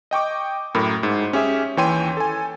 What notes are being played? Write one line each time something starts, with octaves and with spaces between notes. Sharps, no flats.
D#5 G5 C#6 D6
F#2 A2 A#4 B5
G#2
C#4 G4 G#4 E5
D#2 E3 C#5 G5 C6 D#7
A4 G#5